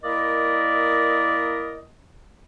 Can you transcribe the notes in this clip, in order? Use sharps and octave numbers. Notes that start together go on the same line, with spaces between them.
A#3 E4 A#4 D5 D#5